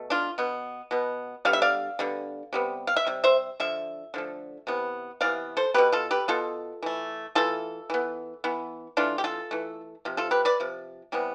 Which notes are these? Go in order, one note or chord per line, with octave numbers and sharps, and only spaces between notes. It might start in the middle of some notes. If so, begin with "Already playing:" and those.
Already playing: B2 A3
D4 F4
B2 B3
B2 B3
D3 G3 B3 F5
E5
D5 F5
D3 G3 B3
C3 G3 B3
F5
E5
C3 G3
C5 E5
D3 F3 E5
D3 F3 A3
C3 E3 B3
C3 E3 B3 D5 F5
A4 C5
B2 B3 G4 B4
F4 A4
G4 B4
B2 B3 F4 A4
E3 A3
E3 A3 F4 A4
E3 B3
E3 B3
E3 A3 D4 F4
G4
F4 A4
E3 A3
C3 F3
F4 A4
G4 B4
B4 D5
C3 F3
C3 E3 G3 B3